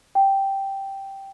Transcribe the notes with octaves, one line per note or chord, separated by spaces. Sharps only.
G5